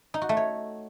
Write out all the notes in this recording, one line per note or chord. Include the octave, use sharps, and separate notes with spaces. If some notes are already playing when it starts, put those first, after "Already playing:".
D#4
F#4
A3
C#5